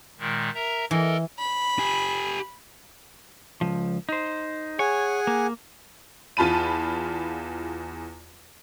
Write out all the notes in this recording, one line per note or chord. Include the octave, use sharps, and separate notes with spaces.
A#2 D#3 G#3
A#4 E5 A#5
E3 A4 A#4 D#5
B5
G4 G#5
C#2 F3
D#4 C5
G#4 C#5 F#5 G#5
A#3
E2 F4 A5 B5 D#7